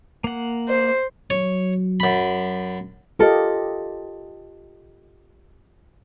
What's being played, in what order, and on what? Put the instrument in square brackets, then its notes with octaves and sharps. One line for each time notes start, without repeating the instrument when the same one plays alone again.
[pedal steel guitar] A#3 F#5
[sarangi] C5
[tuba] F#3 [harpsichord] C#5
[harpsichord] F#2 B5
[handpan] F4 G4 D#5 [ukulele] A4 A#4